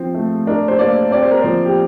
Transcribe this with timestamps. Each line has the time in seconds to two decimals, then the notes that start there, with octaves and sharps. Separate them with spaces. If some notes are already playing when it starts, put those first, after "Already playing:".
Already playing: F3 C4 C5
0.14 A3
0.47 D4 A#4
0.68 C5
0.79 A#3 D5
1.11 C4 D5
1.22 C5
1.31 A#4
1.42 F3 C5
1.65 G4